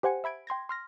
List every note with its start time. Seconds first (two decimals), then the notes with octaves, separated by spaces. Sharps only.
0.03 G4 C5 F#5 G#5 C#7
0.24 E5 B5 G#6 D7
0.47 G5 C6 G#6 A#6
0.69 C6 F6 A#6